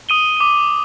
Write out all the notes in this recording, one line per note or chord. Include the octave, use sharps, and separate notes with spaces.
D#6 D#7 G7
D6 D#7